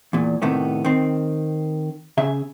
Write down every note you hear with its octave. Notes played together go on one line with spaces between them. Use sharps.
E2 A#2
A2 C3 D#3 A3 B3
D#3 C4
C#3 G#4 E5